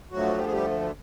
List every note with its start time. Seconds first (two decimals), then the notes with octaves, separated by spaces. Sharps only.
0.11 D2 D3 F3 F#3 A3 F#4
0.38 G4
0.46 G#4
0.53 G3 G4